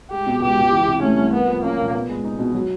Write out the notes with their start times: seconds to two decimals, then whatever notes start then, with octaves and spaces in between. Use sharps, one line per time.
0.11 G#3 G4
0.27 B2
0.41 C#2 G4
0.57 C#2
0.72 E3
0.87 C3
1.02 A3 C#4
1.17 C2
1.34 A#3 B3
1.48 F3
1.63 A#3 C#4
1.79 A#2
1.93 B3
2.09 G#3
2.25 D#4
2.39 B2
2.54 F#3